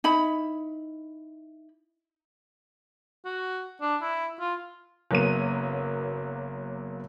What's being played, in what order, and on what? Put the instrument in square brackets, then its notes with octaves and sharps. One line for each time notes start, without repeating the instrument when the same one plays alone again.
[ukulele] D#4 E4 B5
[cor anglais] F#4
D4
E4
F4
[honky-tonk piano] F#1 F#3 A#3 B3 D#7